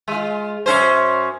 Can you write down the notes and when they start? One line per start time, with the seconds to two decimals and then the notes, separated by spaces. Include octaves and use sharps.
0.08 G#3 F4
0.66 F#2 C#4 C5